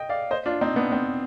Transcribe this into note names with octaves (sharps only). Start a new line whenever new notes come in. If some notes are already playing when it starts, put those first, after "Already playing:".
Already playing: D#5 G5
D5 F5
C5 D#5
D4 F4
C4 D#4
B3 D4
C4